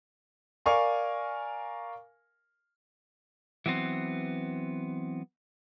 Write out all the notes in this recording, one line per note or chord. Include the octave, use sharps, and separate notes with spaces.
A#4 D5 F5 G#5 C#6
E3 F#3 B3 C4